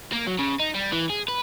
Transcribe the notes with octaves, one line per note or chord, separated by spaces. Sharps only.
A#3
F#3
C#3
D#4
G3
E3
G#4
B4